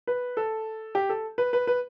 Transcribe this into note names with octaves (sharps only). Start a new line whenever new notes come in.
B4
A4
G4
A4
B4
B4
B4